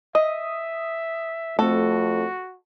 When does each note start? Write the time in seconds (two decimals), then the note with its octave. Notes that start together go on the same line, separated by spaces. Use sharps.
0.15 D#5 E5 D#6
1.59 F2 A3 C4 F#4 A4